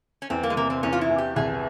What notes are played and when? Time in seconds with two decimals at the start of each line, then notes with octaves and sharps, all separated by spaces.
0.22 C#4
0.30 E2 C4
0.43 A#3
0.50 G#3
0.56 C3 A#3
0.70 C4
0.83 E2 C#4
0.93 F4
1.01 E4
1.10 E2
1.18 G4
1.36 C2 G#4